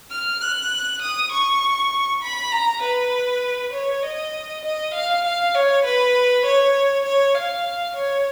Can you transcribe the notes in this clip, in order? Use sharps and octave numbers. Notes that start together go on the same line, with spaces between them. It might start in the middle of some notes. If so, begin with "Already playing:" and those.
F6
F#6
D#6
C#6
B5
A#5
B4
C#5
D#5
D#5
F5
F5
C#5
B4
C#5
C#5
F5
C#5